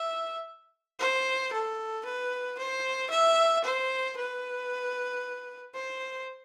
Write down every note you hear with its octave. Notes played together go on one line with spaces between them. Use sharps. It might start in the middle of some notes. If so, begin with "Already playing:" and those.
Already playing: E5
C5
A4
B4
C5
E5
C5
B4
C5